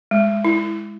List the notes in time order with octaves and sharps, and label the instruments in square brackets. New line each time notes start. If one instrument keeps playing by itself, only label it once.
[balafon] G#3
E4